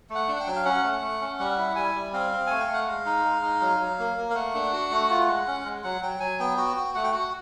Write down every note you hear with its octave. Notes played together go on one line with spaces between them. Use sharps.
A3
F#5
D4
F#5
G5
F#3
F5
C#4 F#5
A3
A3
C#4
G3 F#5
E4
G3 G#5
G3
C4 F5
C4
A3 G#5
G5
A3
F#5
G#3 F5
D#4
G#3
D#4
F#3
F#3
A#3
A#3
F5
A3 F#5
D4
F#4
A3
F4
G#3
C#4
G#3
F#3 F#5
F#3 G5
F#3 G#5
B3 G5
F#4 G5
F#4
A3 F#5
G5
F#4 F#5